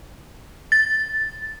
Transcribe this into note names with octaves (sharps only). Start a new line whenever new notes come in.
A6